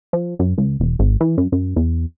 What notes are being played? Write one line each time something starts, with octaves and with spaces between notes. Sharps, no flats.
F3
F#2
C#2
E1
G#1
E3
F#2
F#2
E2